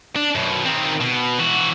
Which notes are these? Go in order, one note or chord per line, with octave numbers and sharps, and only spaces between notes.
D4
F#2 B2
D#3 C4
B2
E3 F#4